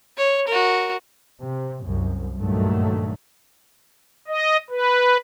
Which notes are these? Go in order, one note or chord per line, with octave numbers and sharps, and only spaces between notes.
C#5
F#4 A#4
C3
C2 F#2
G2 A#2 D#3 F#3 A3
D#5
B4